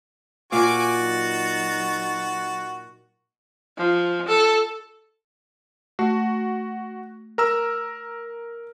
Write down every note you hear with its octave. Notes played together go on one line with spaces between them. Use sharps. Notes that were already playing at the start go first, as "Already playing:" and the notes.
A#2 F#4 F5 G#5 D6 G#6
F#3 D#4 A6
F3
A4
A3 F#4
A#4 A#5 E6